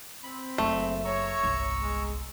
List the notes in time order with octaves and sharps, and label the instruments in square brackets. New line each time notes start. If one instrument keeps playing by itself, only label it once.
[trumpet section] C4 [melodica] B5
[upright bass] F#1 [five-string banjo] A3
[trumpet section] C#5 [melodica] A#5 C#6 E6
[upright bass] G1 C2
[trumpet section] G#3